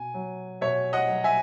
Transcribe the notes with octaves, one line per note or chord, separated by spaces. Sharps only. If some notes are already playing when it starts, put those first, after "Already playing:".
Already playing: B2 G#5
F#3
B2 C#5 E5
D#5 F#5
F#3
E5 G#5